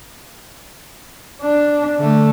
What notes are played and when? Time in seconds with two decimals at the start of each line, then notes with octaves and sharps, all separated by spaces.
1.42 D4
1.98 D3 A3